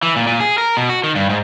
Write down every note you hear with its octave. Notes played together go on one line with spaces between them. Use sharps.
E3
A#2
A#2
G#4
A#4
B2
F#4
D#3
G2
G#2